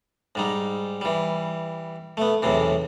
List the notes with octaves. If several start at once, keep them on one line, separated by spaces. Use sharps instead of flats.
G#2 G3 D#4
E3 G3
A3 B3
B1 E2 A2 C3 E3